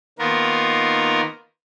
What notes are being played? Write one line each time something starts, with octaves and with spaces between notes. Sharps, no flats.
D#3 A#3 B3 F4 A#4